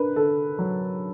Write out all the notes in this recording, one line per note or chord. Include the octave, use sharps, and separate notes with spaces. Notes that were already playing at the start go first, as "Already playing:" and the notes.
Already playing: D4 A#4 B4
D3 A4
F#3